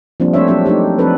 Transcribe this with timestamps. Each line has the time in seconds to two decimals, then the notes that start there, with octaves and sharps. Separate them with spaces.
0.20 F3 G3 A#3 C4 D4
0.33 A3 C4 D4 C5 C#5 E5
0.48 F#3 C4 D4 G4 E5
0.66 A3 D4 D#4 G4
0.99 F3 C4 D4 A4 B4